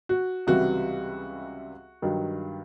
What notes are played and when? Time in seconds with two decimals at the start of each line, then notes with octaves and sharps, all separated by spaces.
0.09 F#4
0.47 C#2 C3 E3 G3 F#4
2.02 G2 D#3 F#3